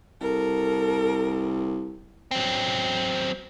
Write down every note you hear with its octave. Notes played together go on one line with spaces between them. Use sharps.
C2 A4 A#4
F#3 C4